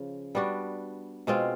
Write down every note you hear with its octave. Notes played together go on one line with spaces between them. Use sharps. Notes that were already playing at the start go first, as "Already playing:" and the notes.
Already playing: C#3 F3
G3 B3 D4 F#4
B2 G#3 C4 F4